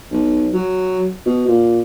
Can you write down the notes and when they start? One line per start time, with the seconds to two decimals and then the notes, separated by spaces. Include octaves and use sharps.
0.12 B1
0.53 F#3
1.26 B2
1.47 A#2